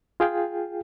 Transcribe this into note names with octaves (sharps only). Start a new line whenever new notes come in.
F4 G#4 F5 G5